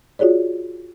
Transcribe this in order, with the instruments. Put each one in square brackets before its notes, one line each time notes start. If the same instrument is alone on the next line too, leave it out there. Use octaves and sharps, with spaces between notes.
[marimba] F4 F#4 G#4 C#5 D5